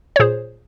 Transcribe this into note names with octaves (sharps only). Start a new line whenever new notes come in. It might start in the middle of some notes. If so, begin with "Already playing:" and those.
C#5
A#2 G#4 C5